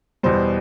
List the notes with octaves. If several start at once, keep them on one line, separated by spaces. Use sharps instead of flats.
E2 B2 G3 C5